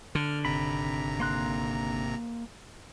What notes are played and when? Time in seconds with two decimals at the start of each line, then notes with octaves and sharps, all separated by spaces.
0.15 D3 F6
0.45 G#1 C3 A#5 B5
1.20 A#3 C6 F#6